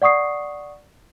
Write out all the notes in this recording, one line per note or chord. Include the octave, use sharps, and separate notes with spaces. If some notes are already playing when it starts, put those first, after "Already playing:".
D5 F#5 C#6 D#6 C7